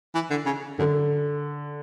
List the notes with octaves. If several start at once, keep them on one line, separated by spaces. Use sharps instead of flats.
E3
D3
C#3
F#2 D3